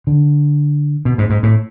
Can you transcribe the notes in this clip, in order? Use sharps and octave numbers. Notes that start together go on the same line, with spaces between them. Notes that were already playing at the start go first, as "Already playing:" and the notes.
D3
B2
G#2
G#2
A2